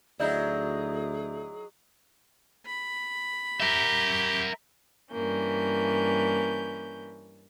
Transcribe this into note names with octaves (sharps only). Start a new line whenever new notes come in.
D2 F#3 D#4 E4 G#4 D5 E5 G6
B5
G4 A#4 E5
G2 E3 A#3 C#4 G6